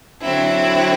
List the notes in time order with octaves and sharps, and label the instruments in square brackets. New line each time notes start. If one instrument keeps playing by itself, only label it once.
[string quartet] D3 F#3 C4 E4